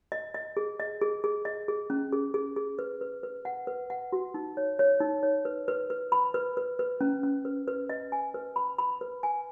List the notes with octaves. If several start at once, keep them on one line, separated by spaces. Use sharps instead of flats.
D#5
D#5
G#4
D#5
G#4
G#4
D#5
G#4
C#4
G#4
G#4
G#4
B4
B4
B4
F#5
B4
F#5
F#4
D#4
C#5
C#5
D#4
C#5
B4
B4
B4
B5
B4
B4
B4
C#4
C#4
B4
B4
D#5
G#5
B4
B5
B5
B4
G#5